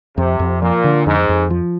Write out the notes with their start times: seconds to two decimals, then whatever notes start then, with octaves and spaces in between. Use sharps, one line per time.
0.17 F2 C3
0.39 F2
0.61 A#2 F3
0.84 D3
1.06 F2 G#2
1.29 F2
1.50 F3